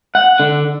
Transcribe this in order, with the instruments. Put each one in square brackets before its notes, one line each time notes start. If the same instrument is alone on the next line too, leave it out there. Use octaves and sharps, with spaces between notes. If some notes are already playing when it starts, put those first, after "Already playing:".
[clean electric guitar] F#5
D3